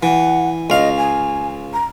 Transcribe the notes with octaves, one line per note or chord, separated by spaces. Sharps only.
E3 F#5
C#2 D#5 F5
G#5
A#5